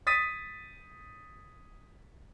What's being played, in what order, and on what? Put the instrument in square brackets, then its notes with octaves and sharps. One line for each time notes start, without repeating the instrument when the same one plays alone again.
[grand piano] D#6 A6 B6 D#7